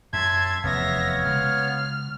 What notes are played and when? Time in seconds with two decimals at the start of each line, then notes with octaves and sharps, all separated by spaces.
0.13 F#2 E5 A5 C6 G#6
0.64 F1 E2 B3 C#5 E5 F5 A#6
1.25 C#3 G#3 F6